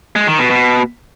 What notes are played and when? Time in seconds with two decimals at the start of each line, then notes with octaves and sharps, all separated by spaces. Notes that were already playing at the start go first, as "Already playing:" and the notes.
0.16 G#3
0.27 D#3
0.39 B2
0.50 B2